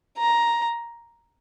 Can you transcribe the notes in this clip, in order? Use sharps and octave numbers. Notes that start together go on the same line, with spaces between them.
A#5